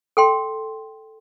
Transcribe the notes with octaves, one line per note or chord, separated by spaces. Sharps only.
A4 G5 C6